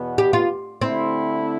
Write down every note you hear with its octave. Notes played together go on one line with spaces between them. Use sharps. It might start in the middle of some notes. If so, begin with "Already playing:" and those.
Already playing: E2 B2 B3
G4
F4
D3 A3 C4 E4